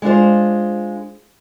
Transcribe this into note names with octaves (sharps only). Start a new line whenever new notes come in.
G#3 D4 F4 C5